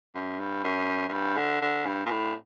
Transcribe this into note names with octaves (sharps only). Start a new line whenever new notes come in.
F#2
G2
F#2
F#2
G2
D3
D3
G2
A#2
A2